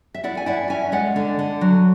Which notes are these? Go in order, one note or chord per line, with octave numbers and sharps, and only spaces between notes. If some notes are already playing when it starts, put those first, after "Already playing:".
E5
E4 D5 F#5
G#5
E4 D5 F#5
C#4 E5 G#5
G#3 D5 F#5
D3
D3
F#3